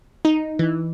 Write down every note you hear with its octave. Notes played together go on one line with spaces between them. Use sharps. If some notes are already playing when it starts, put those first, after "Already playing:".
D#4
E3